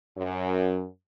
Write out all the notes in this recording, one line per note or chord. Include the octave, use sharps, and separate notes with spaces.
F#2